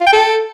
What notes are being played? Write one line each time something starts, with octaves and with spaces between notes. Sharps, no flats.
F4
G5
A4